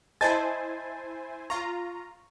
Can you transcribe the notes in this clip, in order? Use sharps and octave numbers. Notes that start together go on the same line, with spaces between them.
E4 C5 D#5 G#5 A5 A6
F4 A#5 C#6